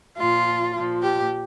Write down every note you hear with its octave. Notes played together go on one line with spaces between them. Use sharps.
A#2 F3 F4
A#2 F3
G4